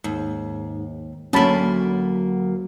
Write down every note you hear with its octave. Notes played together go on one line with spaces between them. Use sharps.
D#2 G#2
D2 F#3 A#3 C#4 A5 B5